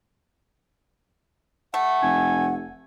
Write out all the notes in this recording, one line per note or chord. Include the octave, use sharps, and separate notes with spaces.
A3 F#5
F1 G#5